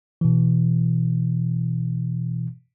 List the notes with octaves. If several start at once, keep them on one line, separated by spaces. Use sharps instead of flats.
B2 E3